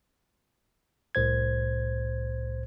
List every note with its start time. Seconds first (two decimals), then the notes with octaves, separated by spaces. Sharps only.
1.15 C2 A2 C5 G#6